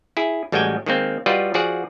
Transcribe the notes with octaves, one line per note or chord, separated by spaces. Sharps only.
E4 G#4
A1 G3 G#3 F#4 G5 G#5
D#3 G#3 A#3 C4
G3 F4 F#4 B4 D5 D#5
F3 F#4 G#4 D5 F#5